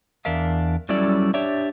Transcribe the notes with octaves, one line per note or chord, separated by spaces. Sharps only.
E2 D4 A#4 E5 F5
F#3 G3 C#4 E4 A4 D5
D4 G4 C#5 D5 E5